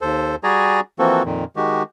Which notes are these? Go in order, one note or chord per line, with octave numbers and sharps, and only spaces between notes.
D#2 A4 C5
G3 F#4 G#4 D5 G#5 A#5
E3 F3 A#3 C4 F#4 A4
F2 A#2 D#3
D#3 G#3 F#4 G4